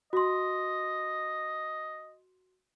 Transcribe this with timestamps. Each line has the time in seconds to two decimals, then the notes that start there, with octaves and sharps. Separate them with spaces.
0.13 F#4 D#5 C6